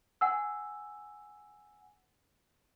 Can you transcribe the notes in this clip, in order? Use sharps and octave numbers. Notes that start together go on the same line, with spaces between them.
F#5 G#5 E6